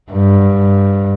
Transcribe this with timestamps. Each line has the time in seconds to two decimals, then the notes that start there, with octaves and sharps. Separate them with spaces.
0.12 G2